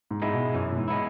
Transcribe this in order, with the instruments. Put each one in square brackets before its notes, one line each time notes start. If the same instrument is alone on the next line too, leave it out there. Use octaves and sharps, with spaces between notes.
[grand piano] G#2
[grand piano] G#2 [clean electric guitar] G#3 B3 E4
[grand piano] B2
[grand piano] F#2 [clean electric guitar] E3
[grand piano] B2
G#2
[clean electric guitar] G#3 B3 E4